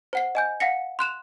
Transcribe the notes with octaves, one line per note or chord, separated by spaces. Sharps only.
C5 F#5 C7
D#5 G#5 G6
F5 F#5 A#6 C#7
C6 F#6 E7 F7